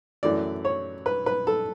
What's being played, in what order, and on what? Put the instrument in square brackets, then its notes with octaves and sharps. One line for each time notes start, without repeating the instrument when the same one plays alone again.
[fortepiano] F#2 E3 A3 D5
C#5
B4
B4
A4